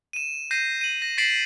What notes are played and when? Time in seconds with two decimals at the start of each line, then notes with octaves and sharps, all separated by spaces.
0.13 D#7 E7
0.51 G6 A#6 C7 D#7
0.81 D#7 F#7
1.02 A#6
1.18 A6 B6 C7 D7 E7 F#7